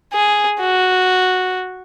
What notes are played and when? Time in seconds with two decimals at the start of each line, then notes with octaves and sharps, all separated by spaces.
0.14 G#4
0.60 F#4